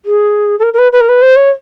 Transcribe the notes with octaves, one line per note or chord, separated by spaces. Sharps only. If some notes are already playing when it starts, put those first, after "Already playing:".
G#4
A4
A#4
A#4
B4
B4
A#4
B4
C5
C#5